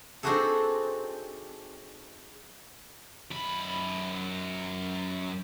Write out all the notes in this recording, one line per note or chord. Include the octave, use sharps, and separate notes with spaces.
C4 D4 D#4 F#4 G#4 A4
F#2 B5